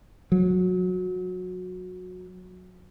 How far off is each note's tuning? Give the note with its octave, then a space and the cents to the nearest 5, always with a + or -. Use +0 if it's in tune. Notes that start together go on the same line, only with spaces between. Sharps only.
F#3 -20